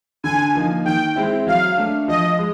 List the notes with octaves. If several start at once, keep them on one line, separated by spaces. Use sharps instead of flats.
D3 G#5
F3 A#3 D#4
D#3 G5
G#3 C4 E4
F#3 F5
A3 D4
F3 D#5
G#3